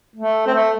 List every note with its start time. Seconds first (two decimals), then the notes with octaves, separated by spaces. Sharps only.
0.16 A3
0.47 C4
0.54 A3